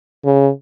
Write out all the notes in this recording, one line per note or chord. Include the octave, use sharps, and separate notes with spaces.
C#3